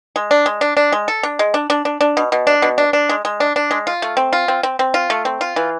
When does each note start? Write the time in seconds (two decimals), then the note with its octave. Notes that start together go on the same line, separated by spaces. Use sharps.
0.16 G#3
0.31 D4
0.46 G#3
0.61 D4
0.77 D4
0.92 G#3
1.08 A4
1.23 D4
1.39 G#3
1.54 D4
1.70 D4
1.85 D4
2.01 D4
2.17 B2
2.32 B2
2.47 D4
2.62 B2
2.78 D4
2.93 D4
3.09 G#3
3.25 G#3
3.40 D4
3.56 D4
3.71 G#3
3.87 F4
4.02 A3
4.17 C4
4.33 F4
4.48 C4
4.63 C4
4.79 C4
4.94 F4
5.10 A3
5.25 C4
5.41 F4
5.56 E3